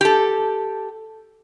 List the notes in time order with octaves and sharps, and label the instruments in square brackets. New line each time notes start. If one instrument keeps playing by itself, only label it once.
[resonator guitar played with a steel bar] G4 A4